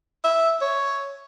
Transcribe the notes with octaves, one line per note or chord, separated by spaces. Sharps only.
E5
C#5